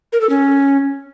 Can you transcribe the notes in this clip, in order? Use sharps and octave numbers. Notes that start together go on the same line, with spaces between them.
A#4
A4
C#4